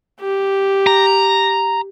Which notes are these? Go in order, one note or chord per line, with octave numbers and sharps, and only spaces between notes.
G4
A#5